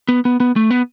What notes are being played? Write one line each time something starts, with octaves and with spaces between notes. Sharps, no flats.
B3
B3
B3
A3
B3